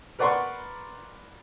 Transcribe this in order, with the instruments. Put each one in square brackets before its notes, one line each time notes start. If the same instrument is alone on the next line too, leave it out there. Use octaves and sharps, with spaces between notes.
[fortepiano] A#4 B4 D5 F#5 C6 C#6